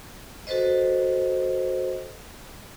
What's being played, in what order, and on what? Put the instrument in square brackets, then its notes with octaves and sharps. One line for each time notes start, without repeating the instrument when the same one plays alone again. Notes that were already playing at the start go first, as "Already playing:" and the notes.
[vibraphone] F#4 A4 B4 C5 D#5